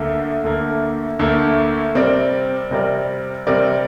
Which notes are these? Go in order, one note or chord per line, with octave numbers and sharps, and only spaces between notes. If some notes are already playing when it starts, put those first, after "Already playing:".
Already playing: D2 D3 A#3
D2 D3 A#3
D2 D3 A#3
C3 G3 C4 A#4 D5
C3 G3 C4 A#4 D5
C3 G3 C4 A#4 D5